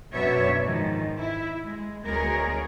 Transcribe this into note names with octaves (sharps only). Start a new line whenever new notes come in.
F#2 B2 B3 D4 C#5 E5
G#2 D#3 F3
E4
G#3
D2 G#3 B3 G#4 A#4 C#5